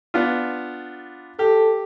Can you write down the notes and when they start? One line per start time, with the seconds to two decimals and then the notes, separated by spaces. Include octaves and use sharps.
0.14 B3 D4 F4
1.39 G4 A4